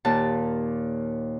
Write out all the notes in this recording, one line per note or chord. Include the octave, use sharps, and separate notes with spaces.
D#2 A#2 A5